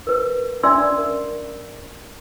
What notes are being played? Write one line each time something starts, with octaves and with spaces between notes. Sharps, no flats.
A#4 B4
C#4 D4 D5 E5 C6 E6
A#4